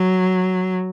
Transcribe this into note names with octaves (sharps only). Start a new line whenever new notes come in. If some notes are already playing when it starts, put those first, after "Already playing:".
Already playing: F#3